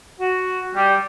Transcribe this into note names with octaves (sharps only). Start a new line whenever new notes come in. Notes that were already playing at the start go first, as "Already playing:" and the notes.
F#4
G3